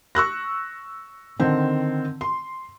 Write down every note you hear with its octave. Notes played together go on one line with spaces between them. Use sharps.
C#6 E6 F#6 A#6
D3 D#3 C4
C6